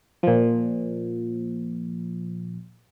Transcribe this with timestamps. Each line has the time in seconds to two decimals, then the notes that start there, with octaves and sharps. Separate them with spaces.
0.23 A#2 F3